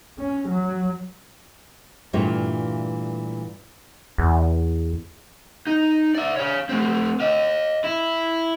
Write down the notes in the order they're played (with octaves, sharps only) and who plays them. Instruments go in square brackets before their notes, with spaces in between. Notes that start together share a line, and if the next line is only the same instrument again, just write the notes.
[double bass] C#4
F#3
[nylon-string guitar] G2 A#2 E3 A3 F4
[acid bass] E2
[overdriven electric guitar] D#4
D5 E5
C#5 F5
A3 C4
D#5 F5
E4